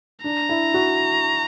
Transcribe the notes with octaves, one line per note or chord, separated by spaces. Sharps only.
D4 A#5
E4
F#4